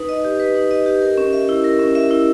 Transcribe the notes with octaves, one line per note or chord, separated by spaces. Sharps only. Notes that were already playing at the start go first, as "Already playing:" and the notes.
Already playing: D#4 B4
D#5
G4
B4
D#4
D#5
G4
A#4
C#4
E5
E4
A#4
C#4
E5
E4